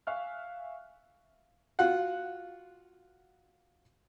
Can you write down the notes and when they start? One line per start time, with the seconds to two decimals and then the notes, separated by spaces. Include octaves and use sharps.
0.07 E5 F5 G#5 C#6 F6 F#6
1.79 F4 F#4 F#5